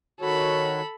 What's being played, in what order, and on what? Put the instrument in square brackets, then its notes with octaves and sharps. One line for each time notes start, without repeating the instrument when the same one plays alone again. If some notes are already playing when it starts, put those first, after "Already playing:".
[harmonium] D#3 F#4 C#5 [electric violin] A4 B5